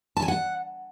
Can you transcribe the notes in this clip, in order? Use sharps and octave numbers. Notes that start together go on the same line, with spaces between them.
A5
G#5
F#5